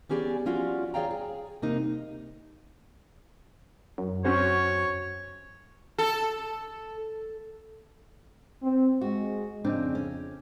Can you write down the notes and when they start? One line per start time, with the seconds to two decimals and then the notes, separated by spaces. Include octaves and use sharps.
0.09 B3 C#4 G4 G#4 C5 D5
0.46 F3 C#4 F4 F#4 D5
0.94 G#4 C#5 D5 F5 G5 A#5
1.11 G#4
1.62 C3 A#3 D#4
3.98 F#2
4.24 C#4 F#4 C5 C#5
5.98 A4
8.63 C4
9.01 G#3 F#4
9.64 F2 C#3 C4 D4 D#4
9.95 C#4